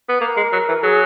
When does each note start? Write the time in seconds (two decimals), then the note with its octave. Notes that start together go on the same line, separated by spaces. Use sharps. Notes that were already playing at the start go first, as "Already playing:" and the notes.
0.09 B3
0.20 A#3 A#4
0.37 G#3
0.52 F#3
0.69 E3
0.83 F#3 G#4